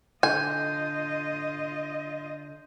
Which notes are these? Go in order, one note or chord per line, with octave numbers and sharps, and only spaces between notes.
D3 F4 D#5 G#5 G6